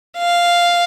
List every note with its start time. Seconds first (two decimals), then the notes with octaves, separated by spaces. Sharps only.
0.18 F5